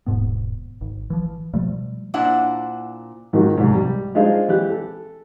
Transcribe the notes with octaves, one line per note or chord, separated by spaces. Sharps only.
D#1 G#2 B2 B3
G#1
E3 F3
B2 F3 G3 A3
A#2 D4 E4 C5 F#5
G#2 D#3 F3 F#3
C2 G#2
G3
G#3 D4 D#4 F4 G#4 C5
E3 G4 F#6
A4